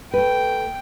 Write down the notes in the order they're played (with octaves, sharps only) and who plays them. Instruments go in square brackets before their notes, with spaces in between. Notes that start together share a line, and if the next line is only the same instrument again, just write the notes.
[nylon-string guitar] A3 B4 [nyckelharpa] G5